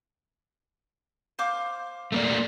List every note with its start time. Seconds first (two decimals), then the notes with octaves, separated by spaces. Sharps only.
1.39 C5 F5 D6
2.12 A3 A#3 D5